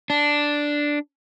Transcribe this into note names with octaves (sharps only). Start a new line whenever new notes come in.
D4